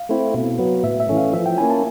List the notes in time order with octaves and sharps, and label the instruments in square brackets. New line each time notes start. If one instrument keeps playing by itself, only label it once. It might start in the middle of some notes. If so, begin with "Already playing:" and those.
Already playing: [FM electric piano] F5
[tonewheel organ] A3 C4 E4
B2
F#3 B3
[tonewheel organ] A2 [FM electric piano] E5
[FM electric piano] E5
[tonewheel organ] E3 A3 C#4
[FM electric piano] F5
[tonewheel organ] F3 [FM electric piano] E5
[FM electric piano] G5
[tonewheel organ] A#3 C#4 E4 [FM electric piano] G#5
[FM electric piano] A5